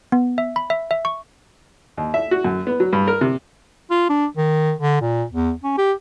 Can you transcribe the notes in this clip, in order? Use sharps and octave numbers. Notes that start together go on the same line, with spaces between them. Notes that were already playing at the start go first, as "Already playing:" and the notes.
B3
E5
B5
E5
E5
C#6
D#2
E5
F#4
F#2
B3
F#3
G2
A#4
C3
F4
D4
D#3
D3
A#2
E2
C#4
G4